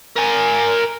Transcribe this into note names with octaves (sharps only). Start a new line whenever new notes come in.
A#4 G#5